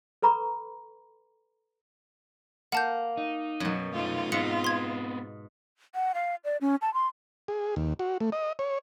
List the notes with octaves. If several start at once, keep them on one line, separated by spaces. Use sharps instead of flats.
A4 B4 A#5 B5 C#6
A#3 F#5 A5 G6
D#4
F#2 B2 F#3
A3 D#4 F4
G#2 B3 C4 C#7
C6 G#6
F#5
F5
D5
C#4
A5
C6
G#4
D#2
F#4
A3
D#5
C#5